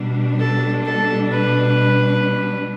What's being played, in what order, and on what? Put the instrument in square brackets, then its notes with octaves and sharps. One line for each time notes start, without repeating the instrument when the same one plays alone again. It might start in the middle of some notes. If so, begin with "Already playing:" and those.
Already playing: [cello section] B2 G3 D4
[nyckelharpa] A4
A4
B4